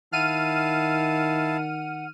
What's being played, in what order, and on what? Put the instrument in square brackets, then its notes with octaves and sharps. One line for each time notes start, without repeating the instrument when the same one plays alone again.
[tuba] D#3 [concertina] E4 F5 A5 [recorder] F#5 [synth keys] F6 D#7